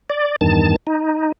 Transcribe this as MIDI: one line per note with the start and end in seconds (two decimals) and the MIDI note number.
0.10 0.36 74
0.41 0.76 40
0.41 0.76 43
0.41 0.76 51
0.41 0.76 81
0.87 1.32 63